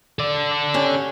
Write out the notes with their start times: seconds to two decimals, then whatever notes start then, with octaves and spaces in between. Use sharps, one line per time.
0.19 A4 D5
0.74 C#4 G4